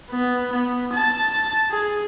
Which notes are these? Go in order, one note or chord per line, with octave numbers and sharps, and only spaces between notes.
B3
B3
A5
G#4